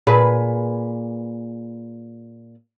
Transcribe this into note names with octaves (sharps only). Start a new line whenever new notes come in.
A#2 G#4 B4